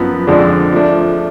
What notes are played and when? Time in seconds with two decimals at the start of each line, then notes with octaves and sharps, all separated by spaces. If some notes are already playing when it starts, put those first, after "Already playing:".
Already playing: F#2 F3 B3
0.27 F2 D3 G#3 D4
0.72 F3 A3 D4